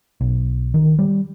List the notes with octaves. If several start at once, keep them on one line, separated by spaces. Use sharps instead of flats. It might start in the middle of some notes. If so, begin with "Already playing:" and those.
B1
D#3
G3